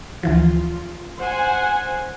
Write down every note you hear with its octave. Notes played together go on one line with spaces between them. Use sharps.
D2 E3 F3 F4
C5 F#5 G#5